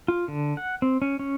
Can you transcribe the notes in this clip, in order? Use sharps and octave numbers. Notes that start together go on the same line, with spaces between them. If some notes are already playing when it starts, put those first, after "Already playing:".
F4
D3
F#5
C4
C#4
C#4